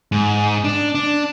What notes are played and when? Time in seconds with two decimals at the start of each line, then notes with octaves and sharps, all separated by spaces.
0.12 G#2
0.64 D4
0.95 D4